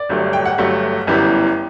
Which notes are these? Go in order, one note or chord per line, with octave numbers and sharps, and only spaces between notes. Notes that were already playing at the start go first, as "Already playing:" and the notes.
Already playing: D5
G1 G2 F#3 A3
G5
F#5
G1 G2 F#3 A3 E5
G1 F#2 E3 G3 B3